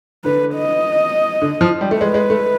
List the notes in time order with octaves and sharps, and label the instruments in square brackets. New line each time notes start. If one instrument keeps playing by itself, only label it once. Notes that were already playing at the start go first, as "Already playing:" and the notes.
[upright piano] D3 [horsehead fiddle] B4
[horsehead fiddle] D#5
[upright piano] D3
F3
G3
A3
[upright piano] G#3 [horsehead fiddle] B4
[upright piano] G#3
A3